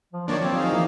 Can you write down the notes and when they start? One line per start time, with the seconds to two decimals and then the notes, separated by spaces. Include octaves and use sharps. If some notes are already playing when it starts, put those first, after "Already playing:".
0.13 F3
0.28 D#3 F3 A#3 D4 C#5 D5
0.42 F3 C4
0.56 D#4 G#4 F5
0.73 E3 A#3